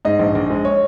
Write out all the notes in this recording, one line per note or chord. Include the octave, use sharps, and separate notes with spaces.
G#2 D#5
A#1
A#1
G#3
C#5